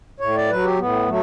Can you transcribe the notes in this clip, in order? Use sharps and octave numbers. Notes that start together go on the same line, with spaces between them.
A2 C#5
D5
F#3 B4
G4
A2 B3
F#3 A3